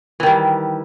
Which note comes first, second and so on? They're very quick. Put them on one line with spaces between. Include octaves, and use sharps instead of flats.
E3 D#3 G3